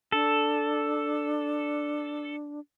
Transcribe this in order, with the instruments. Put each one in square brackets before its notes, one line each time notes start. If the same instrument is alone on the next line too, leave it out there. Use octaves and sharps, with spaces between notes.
[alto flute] D4 [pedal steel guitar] A4